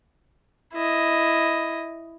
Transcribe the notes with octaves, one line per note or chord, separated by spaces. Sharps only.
E4 D#5